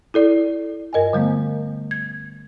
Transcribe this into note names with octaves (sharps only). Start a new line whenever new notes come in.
E4 A4 D5
G2 A#4 D#5 G5 G#5
D3 G3 A3 B3
G#6